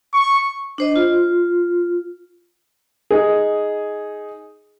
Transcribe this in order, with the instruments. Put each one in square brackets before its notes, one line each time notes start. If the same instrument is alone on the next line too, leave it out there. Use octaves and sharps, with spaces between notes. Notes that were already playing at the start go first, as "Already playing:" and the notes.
[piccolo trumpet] C#6
[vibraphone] D4 C5 D#5
F4
[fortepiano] D#4 G#4